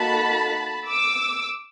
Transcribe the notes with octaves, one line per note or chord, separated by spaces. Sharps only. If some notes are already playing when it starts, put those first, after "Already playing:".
Already playing: A#3 D#4 F#4 A4 A5 B5
D6 E6